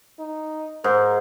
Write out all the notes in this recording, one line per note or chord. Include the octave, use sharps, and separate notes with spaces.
D#4
G#2 A#4